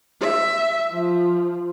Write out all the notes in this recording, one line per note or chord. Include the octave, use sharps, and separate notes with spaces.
E5
F3